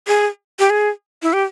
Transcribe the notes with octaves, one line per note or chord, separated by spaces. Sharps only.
G#4
G4
G#4
E4
G4